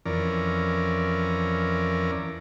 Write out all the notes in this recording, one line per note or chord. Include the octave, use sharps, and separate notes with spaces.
F2 E3 C#4 A#4 D5